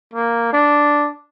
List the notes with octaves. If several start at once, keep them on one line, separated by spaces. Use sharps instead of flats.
A#3
D4